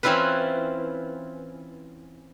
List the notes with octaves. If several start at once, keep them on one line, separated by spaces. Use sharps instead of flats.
E3 C4 C#4 E4 F4 B4